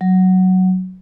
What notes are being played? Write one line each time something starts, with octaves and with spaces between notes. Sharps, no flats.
F#3